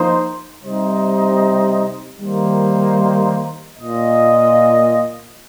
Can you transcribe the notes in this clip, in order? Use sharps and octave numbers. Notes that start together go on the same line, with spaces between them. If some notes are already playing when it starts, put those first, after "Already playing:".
Already playing: F3 A#3 D#4 C5 D#5
C3 G3 D#4 C5 D#5
D#3 G3 A#3 D#4 C5
A#2 A#3 F4 D#5